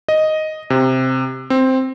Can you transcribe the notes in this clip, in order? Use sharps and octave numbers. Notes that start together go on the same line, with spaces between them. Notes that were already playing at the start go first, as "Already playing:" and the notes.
D#5
C3
C4